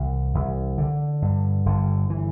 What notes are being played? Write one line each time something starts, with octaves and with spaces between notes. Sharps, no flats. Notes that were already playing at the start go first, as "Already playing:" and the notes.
Already playing: C2 E3
C2
D3
G2
G1 D3
E3